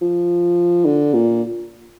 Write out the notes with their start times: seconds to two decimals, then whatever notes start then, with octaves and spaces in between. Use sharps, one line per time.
0.01 F3
0.85 D3
1.13 A#2